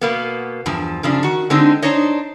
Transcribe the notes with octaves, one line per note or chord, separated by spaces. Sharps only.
B2 A#3 B3
E2 G2 F3
F#2 C#3 F3 D4
D#3 F#4
D3 G#3 C4 D4 D#4
D4 D#4 C5 C#5 D#5